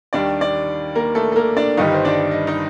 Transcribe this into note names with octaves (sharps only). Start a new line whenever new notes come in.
D#2 D#3 G3 D4 D5
D4 D5
A#3 A#4
A3 A4
A4
A#3 A#4
D4 D5
G1 G2 D#3 G3 D#4 D#5
C5
D4 D5
D#5
D#4 D#5